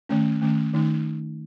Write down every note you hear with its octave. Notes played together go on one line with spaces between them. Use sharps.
D#3 A3 C#4
D#3 A3 C#4
D#3 A3 D#4